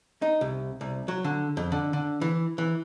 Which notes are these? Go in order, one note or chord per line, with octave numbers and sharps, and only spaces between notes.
D#4
C2
C2
F#3
D3
F2
D3
D3
E3
E3